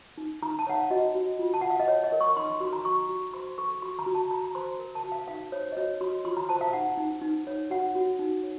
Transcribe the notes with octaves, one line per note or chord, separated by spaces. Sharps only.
D#4
D#4 A#5
A5
C#5 F#5
F5
F#4 D#5
F#4
F4
A5
F4 F#5
F5
D#5
C#5
D#5
A#4
C#6
D#4 C6
C6
F#4 C6
A#5
F#4 C#6
F#4
C5 C6
A4 C#6
F#4 C6
A#5
F#4
A5
F#4 A#5
A#5
C5 C6
A#4
A5
F#4
F5
D#4 F5
C5 C#5
D#5
F#4 C#5
F#4 C6
F4 C6
A#5
C5 A5
F5
D#4 F#5
D#4
D#4
C#5
F#4 F#5
F#4
D#4
C#5